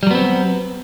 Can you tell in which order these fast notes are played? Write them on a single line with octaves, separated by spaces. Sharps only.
G3 F#3 B3 C4